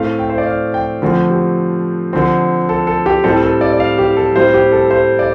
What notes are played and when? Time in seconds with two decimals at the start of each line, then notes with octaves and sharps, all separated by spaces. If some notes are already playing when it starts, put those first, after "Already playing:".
Already playing: A2 A3 C4 F5
0.19 G5
0.30 C5
0.38 D5
0.46 F5
0.74 G5
1.02 D3 F3 A3 C4
1.30 G4
2.13 D3 F3 C4
2.69 A4
2.87 A4
3.06 G4
3.24 A2 G3 C4 A4
3.43 A4
3.61 D5
3.73 D5
3.80 F5
3.98 G4
4.17 A4
4.35 A2 G3 C4 C5
4.54 G4
4.72 A4
4.91 C5
5.19 D5